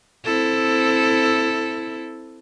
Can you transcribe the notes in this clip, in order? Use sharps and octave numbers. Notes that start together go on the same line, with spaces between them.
C4 E4 A4